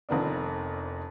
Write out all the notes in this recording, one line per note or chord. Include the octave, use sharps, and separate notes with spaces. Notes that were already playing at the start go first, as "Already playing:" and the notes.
F1 F2 D#3 B3 D4